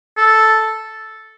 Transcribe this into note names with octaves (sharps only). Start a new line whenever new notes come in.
A4